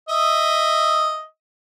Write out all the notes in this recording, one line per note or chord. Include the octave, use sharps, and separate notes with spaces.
D#5 E5